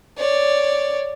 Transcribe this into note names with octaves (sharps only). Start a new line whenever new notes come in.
C#5 D5